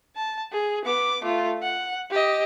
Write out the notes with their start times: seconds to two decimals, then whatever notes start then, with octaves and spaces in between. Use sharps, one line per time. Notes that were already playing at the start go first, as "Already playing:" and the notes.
0.16 A5
0.52 G#4
0.85 B3 D6
1.23 A3 F4
1.62 F#5
2.11 G4 D#5